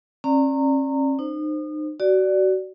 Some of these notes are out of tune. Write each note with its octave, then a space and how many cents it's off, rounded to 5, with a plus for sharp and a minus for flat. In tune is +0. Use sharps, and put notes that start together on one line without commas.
C#4 -40 D5 +0 A#5 -25
D#4 -35 C5 +5
F#4 +30 D5 +0